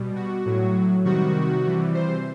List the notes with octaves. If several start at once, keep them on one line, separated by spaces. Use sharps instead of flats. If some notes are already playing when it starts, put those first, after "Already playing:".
Already playing: B2 G3
F#4
A2 F#3
C3 D#3 G3 F#4
C3 E3 G3
C5